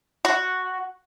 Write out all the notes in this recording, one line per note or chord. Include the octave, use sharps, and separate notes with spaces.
F#4